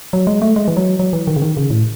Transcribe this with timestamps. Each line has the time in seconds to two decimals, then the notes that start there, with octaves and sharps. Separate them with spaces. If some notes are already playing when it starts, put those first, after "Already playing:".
0.13 F#3
0.27 G#3
0.42 A3
0.56 G#3
0.68 E3
0.77 F#3
0.99 F#3
1.13 E3
1.27 D#3
1.36 C#3
1.42 D#3
1.57 C#3
1.70 A2